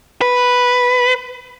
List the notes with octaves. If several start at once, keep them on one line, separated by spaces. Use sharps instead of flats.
B4